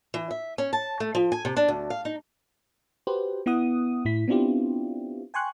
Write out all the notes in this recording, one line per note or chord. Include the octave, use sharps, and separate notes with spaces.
E3
E5
C#4
A5
A3
F3
G#5
C3
D4
D2
F5
D#4
F#4 G4 B4 C5
B3 E4 F#5 D#6
A2 E4 B6
B3 C4 D4 E4 F4 G4
G5 G#5 C6 C#6 F#6